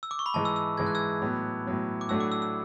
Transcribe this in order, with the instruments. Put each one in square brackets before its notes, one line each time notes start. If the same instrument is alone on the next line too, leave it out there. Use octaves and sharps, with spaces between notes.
[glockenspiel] E6
D6
C#6
B5
[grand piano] G#2 E3 G#3 [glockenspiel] A5
[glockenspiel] E6
E6
[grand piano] G#2 E3 G#3 [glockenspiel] G#6
[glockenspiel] F#6
E6 G#6
[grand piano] A2 F#3 B3
A2 F#3 B3
[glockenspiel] D6
[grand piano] A2 F#3 A3 D4 F#4 [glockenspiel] E6
[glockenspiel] D6
E6
E6